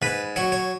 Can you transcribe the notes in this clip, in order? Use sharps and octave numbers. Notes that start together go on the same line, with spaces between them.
G#2 B4
F#3 C#5
C#5